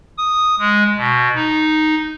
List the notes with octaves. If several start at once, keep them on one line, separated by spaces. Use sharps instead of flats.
D#6
G#3
B2
D#4